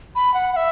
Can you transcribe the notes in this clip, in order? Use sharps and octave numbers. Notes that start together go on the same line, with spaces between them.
B5
F#5
F#5
E5